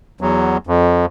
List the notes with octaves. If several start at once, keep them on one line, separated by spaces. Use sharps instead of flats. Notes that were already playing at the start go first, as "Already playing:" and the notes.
E2 F#3
F2